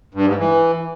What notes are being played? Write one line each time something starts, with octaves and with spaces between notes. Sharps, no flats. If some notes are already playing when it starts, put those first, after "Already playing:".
G2
G#2
E3